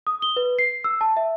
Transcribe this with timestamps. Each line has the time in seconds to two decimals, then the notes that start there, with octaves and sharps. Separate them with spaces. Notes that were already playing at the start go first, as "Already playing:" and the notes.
0.07 D#6
0.22 G7
0.36 B4
0.59 C7
0.84 E6
1.01 A5
1.17 E5